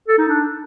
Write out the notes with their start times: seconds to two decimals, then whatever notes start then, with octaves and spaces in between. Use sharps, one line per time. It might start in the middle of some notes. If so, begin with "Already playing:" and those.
0.08 A4
0.18 D#4
0.28 D4